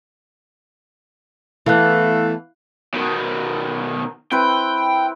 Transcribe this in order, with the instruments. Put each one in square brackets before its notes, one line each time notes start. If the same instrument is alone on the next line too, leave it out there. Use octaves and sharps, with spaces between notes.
[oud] E3 B3 [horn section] A3 A4 [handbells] E4 F5 F#6
[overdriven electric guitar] B2 D#3
[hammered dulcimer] C4 E4 B4 [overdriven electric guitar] G5